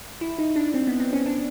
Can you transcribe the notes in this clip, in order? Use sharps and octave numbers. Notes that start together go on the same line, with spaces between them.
E4
D#4
D4
C4
B3
C4
C#4
D4